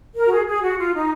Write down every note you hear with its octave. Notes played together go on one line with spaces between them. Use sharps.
A#4
F#4
G#4
G#4
F#4
F4
D#4